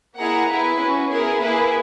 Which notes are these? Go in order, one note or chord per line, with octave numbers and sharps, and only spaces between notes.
A#3 E4 G#4 F#5 A#5
B3 E4 G#4 B4
C#4 F#4
B3 E4 G#4 A#4
A#3 E4 G#4 B4